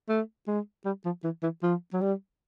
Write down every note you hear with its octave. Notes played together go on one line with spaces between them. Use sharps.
A3
G#3
G3
F3
E3
E3
F3
F#3
G3